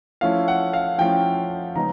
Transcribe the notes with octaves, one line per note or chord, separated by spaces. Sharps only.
F3 A3 C#4 E4 F5
F#5
F5
F3 A3 C#4 E4 G5
C#3 F3 G#3 B3 D#4 A#5